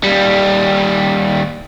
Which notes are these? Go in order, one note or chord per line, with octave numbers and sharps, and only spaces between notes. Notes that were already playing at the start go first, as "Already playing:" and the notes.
D#2 G3